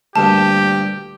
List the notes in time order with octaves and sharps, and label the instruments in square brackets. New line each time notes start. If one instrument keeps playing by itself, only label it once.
[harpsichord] D2 G2 A#2 [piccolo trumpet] G4 [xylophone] A5